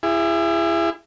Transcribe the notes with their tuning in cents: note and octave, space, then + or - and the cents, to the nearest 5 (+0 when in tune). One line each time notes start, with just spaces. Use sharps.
E4 +30 G#4 -25